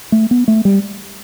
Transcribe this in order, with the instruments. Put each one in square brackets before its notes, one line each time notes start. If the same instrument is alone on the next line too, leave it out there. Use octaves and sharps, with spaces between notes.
[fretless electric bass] A3
B3
A3
G3